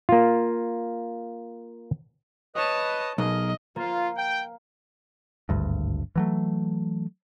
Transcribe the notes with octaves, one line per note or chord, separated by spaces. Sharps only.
A#3 F4
B4 C#5 D#5 A5 D#6
B1 G#4 A#4 D#5
A#3 F4
G5
G#1 D2 G2
E3 F#3 A3